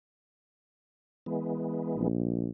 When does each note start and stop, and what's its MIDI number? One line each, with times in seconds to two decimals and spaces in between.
1.26 2.08 52
1.26 2.08 56
1.26 2.08 59
1.97 2.50 34